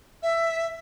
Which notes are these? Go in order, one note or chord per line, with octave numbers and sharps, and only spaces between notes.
E5